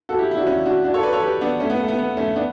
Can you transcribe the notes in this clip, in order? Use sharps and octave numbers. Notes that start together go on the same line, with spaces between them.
F#4 A4
E4 G4
E4
D4 F#4
C#4 E4
D4 F#4
D4 F#4
A4 C#5
B4 D5
A4 C#5
G4 B4
B3 D4
A3 C#4
B3
A3
B3
B3
A3 C#4
B3 D4